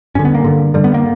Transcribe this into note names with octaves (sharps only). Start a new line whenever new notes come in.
G2 D3 C#4
B3
A#3
G2 D3
G2 D3 G3
B3
A#3